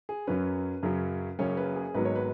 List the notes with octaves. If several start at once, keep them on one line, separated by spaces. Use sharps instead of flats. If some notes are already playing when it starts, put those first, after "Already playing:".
G#4
F#2 F#3 C#4 B4
F#2 C#3 F#3 C#4
F#1 F#2 C#3 F#3 C#4 C#5
B4
G#4
G#1 G#2 F#3 B3 B4
C#5
B4